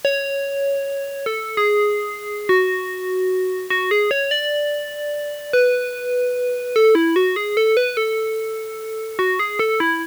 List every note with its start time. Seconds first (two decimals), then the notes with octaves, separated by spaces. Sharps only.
0.05 C#5
1.26 A4
1.57 G#4
2.49 F#4
3.70 F#4
3.91 G#4
4.11 C#5
4.31 D5
5.53 B4
6.76 A4
6.95 E4
7.16 F#4
7.36 G#4
7.57 A4
7.77 B4
7.97 A4
9.19 F#4
9.39 G#4
9.59 A4
9.80 E4